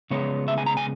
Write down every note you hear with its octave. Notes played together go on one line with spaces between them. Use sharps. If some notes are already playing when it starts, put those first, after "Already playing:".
C#3 G#3 B3 C#5
E5
G#5
A#5
G#5